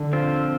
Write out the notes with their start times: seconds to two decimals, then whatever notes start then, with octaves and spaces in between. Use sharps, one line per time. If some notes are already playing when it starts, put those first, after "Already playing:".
Already playing: D3
0.13 F3 C4 F4 C5